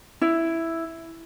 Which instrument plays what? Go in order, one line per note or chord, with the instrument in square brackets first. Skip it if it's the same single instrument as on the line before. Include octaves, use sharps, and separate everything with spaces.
[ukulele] E4